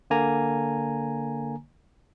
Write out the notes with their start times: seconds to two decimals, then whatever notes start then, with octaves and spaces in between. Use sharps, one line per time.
0.10 D3 A#3 G#5 A#5